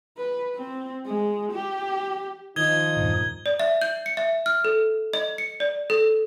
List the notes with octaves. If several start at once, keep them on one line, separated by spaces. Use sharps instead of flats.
B4
C4
G#3
G4
D#3 F3 D#4 D#6 G#6 G7
E2 G2 A#2
D5
E5
G6
C#7
E5
F6
A4
D#5
C#7
D5
A4